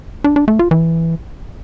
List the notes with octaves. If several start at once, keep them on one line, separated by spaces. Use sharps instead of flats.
D4
D4
A3
F4
E3